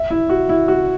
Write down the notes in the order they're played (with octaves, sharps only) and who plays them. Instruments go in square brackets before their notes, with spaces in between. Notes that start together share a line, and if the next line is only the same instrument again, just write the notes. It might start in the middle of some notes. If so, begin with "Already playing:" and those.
Already playing: [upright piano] E5
E4
F#4
E4
F#4